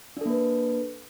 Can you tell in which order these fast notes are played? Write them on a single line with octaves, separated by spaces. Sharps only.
D4 A4 A#3 B4